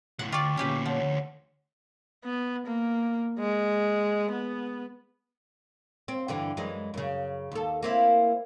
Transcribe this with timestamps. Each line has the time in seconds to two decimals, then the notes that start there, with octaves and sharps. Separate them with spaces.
0.19 C#2 A2 F#5
0.32 D2 F4 D5 G5 C#6 D6
0.57 D2 A#2 C#4 G4 B4
0.86 F3 C#5 F#5
0.99 D2
2.25 B3
2.67 A#3
3.39 G#3
4.32 B3
6.08 C4
6.28 G2 D3 E3
6.57 F#2 E3 G#3
6.94 F#2 C#3
7.52 D#2 A4
7.83 A#3 C4 E4